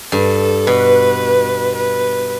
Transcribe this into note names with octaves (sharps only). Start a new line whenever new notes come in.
G2 A4
B2 B4
B4